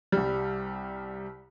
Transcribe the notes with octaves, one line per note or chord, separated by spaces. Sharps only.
C2 G3